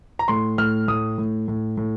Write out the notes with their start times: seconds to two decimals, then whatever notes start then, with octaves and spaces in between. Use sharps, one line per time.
0.19 A#5
0.28 A2 C6
0.58 A2 F6
0.88 A2 D#6
1.18 A2
1.48 A2
1.77 A2